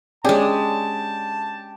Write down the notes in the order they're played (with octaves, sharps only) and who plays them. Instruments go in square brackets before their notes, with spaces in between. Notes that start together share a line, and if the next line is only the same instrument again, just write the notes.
[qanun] G#3 G#4 [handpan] C#4 D4 [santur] G4 [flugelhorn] A5